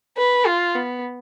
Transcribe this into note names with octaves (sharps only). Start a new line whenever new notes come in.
B4
F4
B3